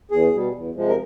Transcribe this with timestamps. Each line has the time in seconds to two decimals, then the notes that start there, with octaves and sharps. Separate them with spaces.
0.11 E2 G#4
0.33 B2 G3
0.53 E2
0.75 C3 F3 G#3
0.88 A#4